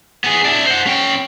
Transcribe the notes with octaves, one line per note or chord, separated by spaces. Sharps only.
B3 G#4
D4 E4
C5 F#5
C#4 G5